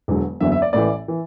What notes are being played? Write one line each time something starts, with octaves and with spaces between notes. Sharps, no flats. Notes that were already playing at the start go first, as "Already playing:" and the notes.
E1 E2 D3 F#3
F#1 E2 D3 F#3 E5
E5
D5
A1 A2 E3 D5
E3